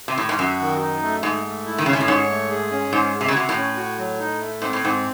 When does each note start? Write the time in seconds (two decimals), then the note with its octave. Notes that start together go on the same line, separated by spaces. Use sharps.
0.08 C3
0.18 A2
0.29 G#2
0.39 F#2 F#4
0.61 D#3
0.81 D#4
1.02 A3
1.23 G#2 A3
1.45 A3
1.66 E4
1.78 D#3
1.86 C#3 C#4
1.93 C3
2.00 A2
2.08 G#2 C#5
2.30 A3
2.50 G#4
2.71 C#4
2.93 G#2 C5
3.14 G#3
3.21 C3
3.28 C#3
3.35 C3 F#4
3.49 A2
3.56 C#4
3.76 F#4
3.98 F#3
4.19 D#4
4.41 A3
4.62 G#2 C4
4.73 A2
4.83 G#2 C4